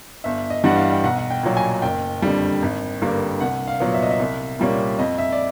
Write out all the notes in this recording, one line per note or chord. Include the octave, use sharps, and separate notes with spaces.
G1 E5
D#5
G2 E3 G3 F#5
F5
G5
B1 F#5
F#5
G5
A#2 F#3
G#5
F#1 G5
F2 D3 G3
G#1
G2 D3 G3 A#3
C2 F#5
F5
A#2 F#3 B3
E5
D#5
E5
C2
A#2 G3 A#3 C#4
F2 D#5
E5
D5